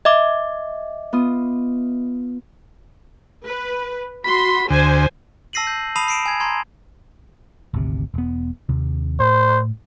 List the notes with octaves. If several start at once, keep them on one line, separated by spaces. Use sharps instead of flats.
D#5 E5 D6
B3 F4 D#6
B4
F#4 B5 C6
D2 C5 G#5
A5 E6 A#6 C7 D#7 F#7
G6
A5 B5 D#6 C7 D#7 F7
C7 D7 E7
G#5 G#6
A#5 C6 G#6
G#1 D2 C3
E1 B3
D#2 C3
A2 C5